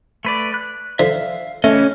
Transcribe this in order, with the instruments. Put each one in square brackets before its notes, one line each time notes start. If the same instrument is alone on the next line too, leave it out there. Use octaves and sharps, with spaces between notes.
[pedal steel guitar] A3 B4 D5
F#6
[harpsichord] D3 F3 [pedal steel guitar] E5 F5
[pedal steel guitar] C#3 E3 D#5 [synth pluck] A3 [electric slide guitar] C#4